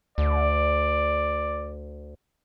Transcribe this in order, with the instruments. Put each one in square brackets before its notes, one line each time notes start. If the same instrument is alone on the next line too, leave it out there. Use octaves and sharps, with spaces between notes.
[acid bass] D2 [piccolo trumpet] D5